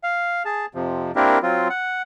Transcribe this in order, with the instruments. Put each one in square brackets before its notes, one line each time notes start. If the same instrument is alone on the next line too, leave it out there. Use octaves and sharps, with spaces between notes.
[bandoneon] F5
G#4 A5
F2 C3 F3
A#3 C4 D4 E4 G4 A#4
F#3 C4 F4
F#5